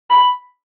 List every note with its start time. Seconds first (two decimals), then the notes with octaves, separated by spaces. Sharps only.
0.10 B5